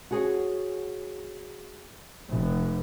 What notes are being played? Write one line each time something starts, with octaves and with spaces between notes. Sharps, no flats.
F#4 G#4 C#5
F1